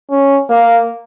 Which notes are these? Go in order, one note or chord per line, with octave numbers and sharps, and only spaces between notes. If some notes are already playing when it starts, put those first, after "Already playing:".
C#4
A#3